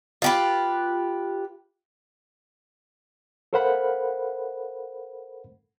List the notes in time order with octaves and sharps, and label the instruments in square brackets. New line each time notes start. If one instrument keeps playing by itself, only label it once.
[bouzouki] F4 G4 B4
[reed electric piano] A4 A#4 C5 F5 F#5 B5